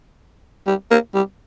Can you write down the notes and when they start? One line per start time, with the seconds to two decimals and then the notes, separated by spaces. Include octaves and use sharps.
0.67 G3
0.91 A#3
1.14 G3